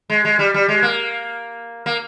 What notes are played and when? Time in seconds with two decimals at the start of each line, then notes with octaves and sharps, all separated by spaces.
0.10 G#3
0.25 G#3
0.39 G3
0.54 G3
0.68 G#3
0.83 A#3
1.86 A#3